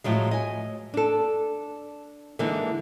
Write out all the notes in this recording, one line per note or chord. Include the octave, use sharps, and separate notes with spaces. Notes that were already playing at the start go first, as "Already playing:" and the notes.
A2 F3 F#3 G#3
D#5 G#5
D4 A4
D3 E3 G#3 A#3 D#4